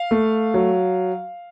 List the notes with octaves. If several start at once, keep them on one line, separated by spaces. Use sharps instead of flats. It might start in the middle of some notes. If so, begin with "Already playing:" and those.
Already playing: F5
A3
F#3